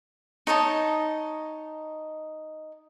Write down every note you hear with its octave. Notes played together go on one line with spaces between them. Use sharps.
D#4 C#5 D#5 A5